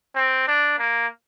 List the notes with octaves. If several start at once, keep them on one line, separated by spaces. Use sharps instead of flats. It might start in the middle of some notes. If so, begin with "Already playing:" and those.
C4
D4
A#3